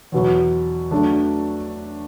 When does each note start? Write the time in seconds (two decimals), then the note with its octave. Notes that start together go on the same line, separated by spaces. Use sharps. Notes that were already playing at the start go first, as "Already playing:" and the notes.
0.12 E2 B2 F#3
0.91 F#3 A3 D4